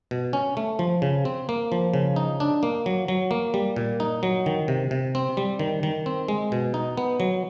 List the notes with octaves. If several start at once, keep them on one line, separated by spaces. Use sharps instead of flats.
B2
C#4
A3
F3
C#3
C4
A#3
F3
C#3
D#4
D4
A#3
F#3
F#3
A#3
G3
A#2
D#4
F#3
D#3
C3
C3
C4
G3
D#3
D#3
C4
G#3
B2
D#4
B3
F#3